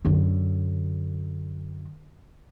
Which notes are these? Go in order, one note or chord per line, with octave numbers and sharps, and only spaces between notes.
F#2 D3